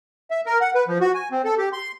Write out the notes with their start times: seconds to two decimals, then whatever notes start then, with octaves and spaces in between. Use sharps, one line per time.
0.31 E5
0.46 A#4
0.61 F#5
0.75 B4
0.88 F3
1.01 F#4
1.14 G#5
1.32 C4
1.44 A4
1.58 G4
1.73 C6